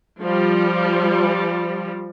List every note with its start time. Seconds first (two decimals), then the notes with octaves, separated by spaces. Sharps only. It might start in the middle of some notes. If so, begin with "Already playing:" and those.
0.20 F3 G3